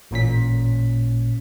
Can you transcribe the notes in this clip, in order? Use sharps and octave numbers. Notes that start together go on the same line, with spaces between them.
A1 A#2 C#4 B6